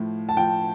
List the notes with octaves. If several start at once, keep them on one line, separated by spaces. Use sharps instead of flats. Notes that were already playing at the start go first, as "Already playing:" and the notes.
Already playing: A2 F3
A5
F3 G5